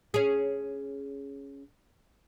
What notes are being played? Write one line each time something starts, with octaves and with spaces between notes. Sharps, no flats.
C#4 G#4